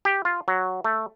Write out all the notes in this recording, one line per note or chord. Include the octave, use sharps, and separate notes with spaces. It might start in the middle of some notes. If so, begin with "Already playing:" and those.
G4
F4
F#3
A3